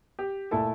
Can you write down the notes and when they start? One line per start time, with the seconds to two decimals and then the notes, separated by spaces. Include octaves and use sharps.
0.19 G4
0.51 A#2 A3 E4 A4